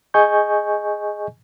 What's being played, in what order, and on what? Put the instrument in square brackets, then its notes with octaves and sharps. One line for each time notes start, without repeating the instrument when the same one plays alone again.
[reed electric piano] G#4 D#5 G#5 C#6 G6